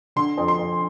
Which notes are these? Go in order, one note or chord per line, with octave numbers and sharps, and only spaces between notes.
D3 C6
F2
C6
F2